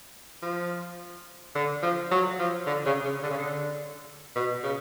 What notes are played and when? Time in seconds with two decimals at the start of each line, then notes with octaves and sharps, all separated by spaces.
0.42 F3
1.55 D3
1.82 F3
2.11 F#3
2.39 F3
2.67 D3
2.86 C#3
3.05 C#3
3.23 D3
3.30 C#3
3.38 D3
4.36 B2
4.63 C#3